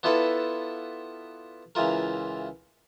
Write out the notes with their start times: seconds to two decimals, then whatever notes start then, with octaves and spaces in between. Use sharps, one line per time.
0.03 B3 D4 E4 F4 A4 B4
1.75 C#2 E3 F4 A#4